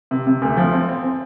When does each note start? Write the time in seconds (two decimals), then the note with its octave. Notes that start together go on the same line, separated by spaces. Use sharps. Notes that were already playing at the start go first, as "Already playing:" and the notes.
0.11 C3
0.27 C3
0.42 D2
0.57 F3
0.73 C4
0.89 C4
1.04 C4